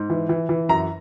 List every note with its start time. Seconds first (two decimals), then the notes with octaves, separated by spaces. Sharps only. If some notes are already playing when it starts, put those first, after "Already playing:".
Already playing: G#2
0.10 E3
0.29 E3
0.49 E3
0.69 F#2 A#5